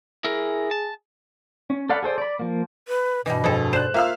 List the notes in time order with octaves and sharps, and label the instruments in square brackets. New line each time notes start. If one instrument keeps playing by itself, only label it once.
[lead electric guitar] E4 A#4 [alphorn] G#4
[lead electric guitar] A5
[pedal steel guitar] C#4
A4 D5 F5 F#5 B5
G#4 A4 C5 D5
D5 B5
F3 A#3
[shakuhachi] B4
[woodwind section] G2 B2 [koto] E3 G3 [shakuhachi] D#5
[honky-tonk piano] F2 [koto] E3 G#3 A4
[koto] C5 [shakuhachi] D5 [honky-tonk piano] F#6 E7
[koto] A#3 [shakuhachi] F4 [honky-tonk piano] E5 F5 E6